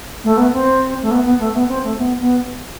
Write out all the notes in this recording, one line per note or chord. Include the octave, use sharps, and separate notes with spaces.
A3
B3
C4
A3
B3
B3
A3
B3
C4
A3
B3
B3